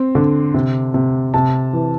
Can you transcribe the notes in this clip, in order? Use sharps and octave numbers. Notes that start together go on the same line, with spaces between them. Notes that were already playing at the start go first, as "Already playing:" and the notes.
Already playing: C4
D3
C3
C3
C3 A5
E3